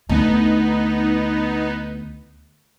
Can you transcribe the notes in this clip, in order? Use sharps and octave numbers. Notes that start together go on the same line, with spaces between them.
D2 B3 D#4